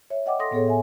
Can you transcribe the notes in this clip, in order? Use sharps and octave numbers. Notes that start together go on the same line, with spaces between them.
C#5 E5
D#5 F#5 G5 D6
A4 C6 D#6 A#6
A2 B3 G#4 A4 C#5
E5 G#5